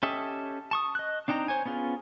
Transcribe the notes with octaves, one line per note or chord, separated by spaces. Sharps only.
C#4 G4 A4 D#5 E5
A5 C#6 D#6
D#5 F#6
C4 D4 D#4 G5 A#5
C5 C#5 G#5
B3 C#4 F4 G#4